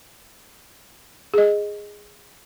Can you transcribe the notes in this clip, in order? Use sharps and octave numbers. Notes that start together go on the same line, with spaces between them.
G#4 D#5